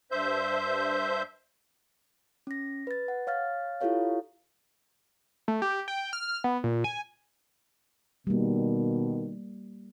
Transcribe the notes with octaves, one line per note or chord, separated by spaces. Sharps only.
G2 C5 E5 G6
C#4 A#6
B4 A6
F#5
C#5 F5 F6 A6
E4 F4 G4 A4 C#5 F5
A3
G4
G5
F6
B3
A#2
G#5
B2 D#3 G3 A#3